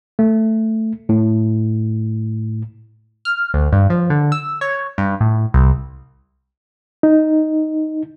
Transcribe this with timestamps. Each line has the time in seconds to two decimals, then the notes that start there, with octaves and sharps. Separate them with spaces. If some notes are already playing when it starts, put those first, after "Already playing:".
0.19 A3
1.09 A2
3.25 F6
3.54 D2
3.72 G2
3.90 F3
4.10 D3
4.32 E6
4.61 C#5
4.98 G2
5.21 A2
5.54 C2
7.03 D#4